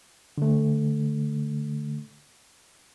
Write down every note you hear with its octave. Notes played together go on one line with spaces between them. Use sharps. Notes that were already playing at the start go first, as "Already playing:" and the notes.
D3 A3